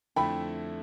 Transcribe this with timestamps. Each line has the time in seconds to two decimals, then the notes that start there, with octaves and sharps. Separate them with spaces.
0.16 F2 D3 A3 E4 G5 B5